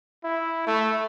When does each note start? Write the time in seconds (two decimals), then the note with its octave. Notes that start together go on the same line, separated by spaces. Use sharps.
0.24 E4
0.67 A3